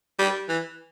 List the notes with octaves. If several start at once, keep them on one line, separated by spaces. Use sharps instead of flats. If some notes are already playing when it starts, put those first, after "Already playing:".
G3
E3